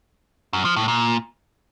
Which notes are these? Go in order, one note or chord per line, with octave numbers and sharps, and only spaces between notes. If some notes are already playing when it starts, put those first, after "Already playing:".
F#2
F3
A2
A#2